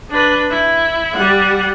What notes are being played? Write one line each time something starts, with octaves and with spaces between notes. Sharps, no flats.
D4 B4
E4
G3 F#5